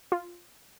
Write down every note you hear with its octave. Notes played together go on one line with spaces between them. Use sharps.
F4